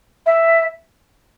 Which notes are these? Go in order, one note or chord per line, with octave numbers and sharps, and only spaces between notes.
E5